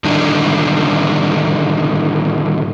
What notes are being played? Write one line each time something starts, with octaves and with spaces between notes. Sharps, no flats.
A2 D3 D#3 G3 D4 D#4